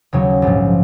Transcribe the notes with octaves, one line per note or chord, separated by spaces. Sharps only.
D#2 C#3 F#3 C#5
A#1 G#2 F3